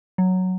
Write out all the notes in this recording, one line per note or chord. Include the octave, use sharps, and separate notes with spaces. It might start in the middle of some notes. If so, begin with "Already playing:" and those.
F#3